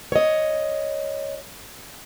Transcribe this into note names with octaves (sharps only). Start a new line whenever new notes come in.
C#5 D#5